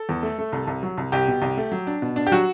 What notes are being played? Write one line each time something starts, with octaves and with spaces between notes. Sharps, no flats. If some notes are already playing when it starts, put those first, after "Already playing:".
Already playing: A4
E2
A3
A3
C2
C2
F#3
C2
C2 G4
B2
C2
A3
F#3
D4
B2
D4
G4
F#3 F#4